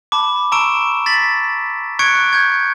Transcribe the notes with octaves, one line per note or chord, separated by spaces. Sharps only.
A5 B5 D6
A5 A#5 C#6 E6 D7 E7
A6 B6 F#7
C#6 F#6 G#6 C#7 D7
G6 G#6